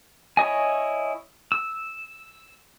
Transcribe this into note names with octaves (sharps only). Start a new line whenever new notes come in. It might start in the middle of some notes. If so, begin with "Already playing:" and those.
E4 C#5 D#5 G#5
E6